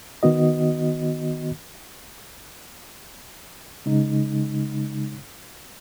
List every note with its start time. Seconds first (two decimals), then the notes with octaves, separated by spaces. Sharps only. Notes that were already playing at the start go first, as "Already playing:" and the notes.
0.23 D#3 B3 F#4 D#5
3.86 C#3 G#3 D#4